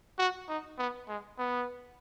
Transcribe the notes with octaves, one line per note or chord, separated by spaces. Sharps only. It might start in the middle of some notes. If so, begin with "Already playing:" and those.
F#4
D#4
B3
G#3
B3